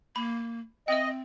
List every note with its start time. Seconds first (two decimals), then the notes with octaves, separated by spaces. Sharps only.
0.16 A#3 B5
0.88 C4 D#5 E5 G5